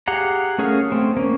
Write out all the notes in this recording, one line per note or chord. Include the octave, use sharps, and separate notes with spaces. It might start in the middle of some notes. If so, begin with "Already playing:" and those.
G4 G#4 F5 F#5 A#5
A3 C#4 G#4 A#4 F5
A3 C4
A#3 C#4